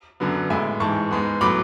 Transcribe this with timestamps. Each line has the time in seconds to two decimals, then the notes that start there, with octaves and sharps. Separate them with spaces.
0.20 F#2 D3 F#3 B3
0.50 A2 G#3 B3 E5 G#5
0.80 G#2 E3 G#3 A5 C#6
1.11 G#2 G#3 B3
1.41 A2 F#3 B3 B5 D6